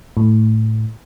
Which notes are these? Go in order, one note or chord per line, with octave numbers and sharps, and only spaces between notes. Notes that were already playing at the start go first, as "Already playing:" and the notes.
A2